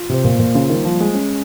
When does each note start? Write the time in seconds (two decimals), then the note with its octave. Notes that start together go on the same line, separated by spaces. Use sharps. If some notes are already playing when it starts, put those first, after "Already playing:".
Already playing: F4
0.09 C3 C5
0.24 A#2
0.35 A#2 A#3
0.55 C#3 F4
0.69 D#3 G3
0.84 F3
0.94 G3
1.01 G#3
1.15 C#4